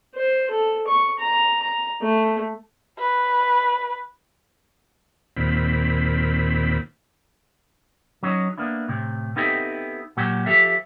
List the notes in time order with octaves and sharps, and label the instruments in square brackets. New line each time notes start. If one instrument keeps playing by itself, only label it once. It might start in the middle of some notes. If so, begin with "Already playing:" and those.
[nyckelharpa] C5
A4
C#6
A#5
A#5
A3
[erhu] B4
[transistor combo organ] D#2 A#2 C4 B5
[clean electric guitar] F#3 C#4 D#4
A#3 B3 D4 E4
A2 C3
B3 C4 D#4 E4 G4 A4
A#2 F#3 F#4 G4
F3 G4 A4 E5